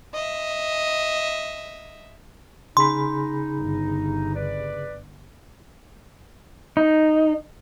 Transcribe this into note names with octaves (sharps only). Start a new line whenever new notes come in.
D#5 E5
C#3 D#4 G#4 B5 C6
G1
B4 D5
D#4